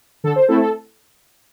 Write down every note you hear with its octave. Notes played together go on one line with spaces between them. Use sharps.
D3 A4
C5
A3 C4 E4 A4
A4